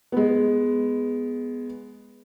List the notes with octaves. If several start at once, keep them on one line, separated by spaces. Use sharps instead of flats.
G#3 B3